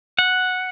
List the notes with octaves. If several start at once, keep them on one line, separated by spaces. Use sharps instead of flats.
F#5